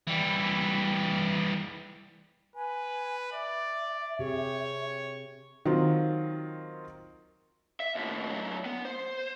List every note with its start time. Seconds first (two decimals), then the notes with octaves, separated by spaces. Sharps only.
0.07 E3 G3
2.56 B4 G#5
3.32 D5 E5
4.19 C3 G4 G#4 C#5
5.66 D#3 F#3 C4 F4
7.80 E5
7.95 D#2 A2
8.30 A2 F#3
8.65 B3
8.85 C5